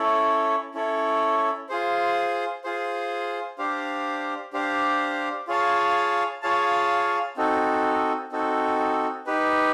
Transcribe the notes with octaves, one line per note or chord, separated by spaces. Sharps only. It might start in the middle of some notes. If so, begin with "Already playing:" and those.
Already playing: C#4 E4 A4 C#5
C#4 E4 A4 C#5
F4 G#4 C5
F4 G#4 C5
D4 G4 C5 F5
D4 G4 C5 F5
F4 G#4 C#5 F5 A5
F4 G#4 C#5 F5 A5
C4 D#4 F#4 A4
C4 D#4 F#4 A4
D#4 G4 B4